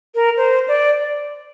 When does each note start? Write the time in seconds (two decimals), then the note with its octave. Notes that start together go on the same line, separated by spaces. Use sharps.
0.15 A#4
0.37 C5
0.68 D5